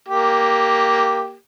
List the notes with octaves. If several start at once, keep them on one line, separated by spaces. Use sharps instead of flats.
A#3 G4